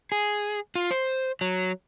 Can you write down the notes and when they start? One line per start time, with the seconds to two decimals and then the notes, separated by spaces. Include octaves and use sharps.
0.12 G#4
0.75 F4
0.91 C5
1.41 F#3